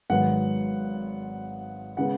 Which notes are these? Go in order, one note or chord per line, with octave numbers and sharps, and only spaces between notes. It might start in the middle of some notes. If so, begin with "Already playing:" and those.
G#1 G#2 F#3 B3 F#5
C#3 G#3 B3 F#5